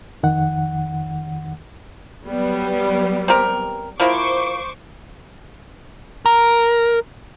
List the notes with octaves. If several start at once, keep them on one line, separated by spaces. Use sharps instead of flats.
F2 D#3 F#5
F#3 G3 B3
C4 G4 A#4
F3 A#3 E4 C5 C#6 D6
A#4